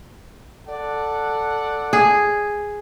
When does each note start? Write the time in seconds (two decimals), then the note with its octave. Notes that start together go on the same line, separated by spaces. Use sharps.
0.68 A4 D5 F#5
1.93 G#4